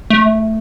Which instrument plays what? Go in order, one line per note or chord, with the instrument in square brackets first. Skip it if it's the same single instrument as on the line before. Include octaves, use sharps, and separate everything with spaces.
[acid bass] A3